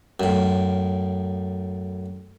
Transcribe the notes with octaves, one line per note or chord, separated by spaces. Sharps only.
F#2 A2